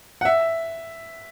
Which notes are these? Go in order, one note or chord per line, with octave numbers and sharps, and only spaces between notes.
F#5
E5